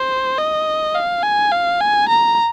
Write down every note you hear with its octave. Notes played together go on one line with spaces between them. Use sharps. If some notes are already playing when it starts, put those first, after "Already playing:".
Already playing: C5
D#5
F5
G#5
F5
G#5
A#5